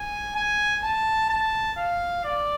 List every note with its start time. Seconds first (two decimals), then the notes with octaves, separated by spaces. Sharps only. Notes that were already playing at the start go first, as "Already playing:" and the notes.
Already playing: G#5
0.36 G#5
0.83 A5
1.29 A5
1.77 F5
2.24 D5